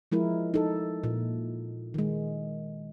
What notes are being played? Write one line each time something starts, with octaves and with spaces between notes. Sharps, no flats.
F3 G#3 E4 A#4
D#4 A4
A#2
D#3 G#3